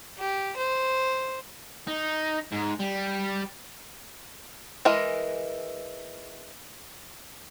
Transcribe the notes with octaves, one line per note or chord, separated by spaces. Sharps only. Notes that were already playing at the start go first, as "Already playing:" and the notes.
G4
C5
D#4
G#2
G3
E3 G#3 A#4